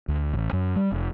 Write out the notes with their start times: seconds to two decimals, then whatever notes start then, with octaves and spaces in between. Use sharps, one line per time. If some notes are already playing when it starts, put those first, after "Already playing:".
0.08 D2
0.33 A1
0.53 F#2
0.76 G3
0.92 F1